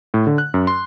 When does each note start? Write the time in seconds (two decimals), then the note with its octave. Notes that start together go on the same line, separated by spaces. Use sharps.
0.14 A2
0.27 D3
0.38 F#6
0.54 F#2
0.67 C6